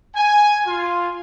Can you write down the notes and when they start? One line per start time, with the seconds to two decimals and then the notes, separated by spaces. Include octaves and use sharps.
0.14 G#5
0.66 F4